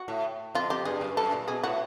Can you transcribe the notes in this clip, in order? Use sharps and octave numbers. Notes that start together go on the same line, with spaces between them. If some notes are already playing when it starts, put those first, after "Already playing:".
Already playing: F#4
A2
F2 F4
F2 G4
G2 G#4
F#2
F#2 A4
A#2
B2 G#4
A2 F#4